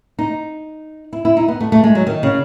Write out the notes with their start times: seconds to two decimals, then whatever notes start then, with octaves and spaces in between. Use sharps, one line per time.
0.19 D#4
1.13 E4
1.25 E4
1.37 D#4
1.48 B3
1.61 A3
1.72 A3
1.84 G#3
1.95 F#3
2.07 D#3
2.23 C#3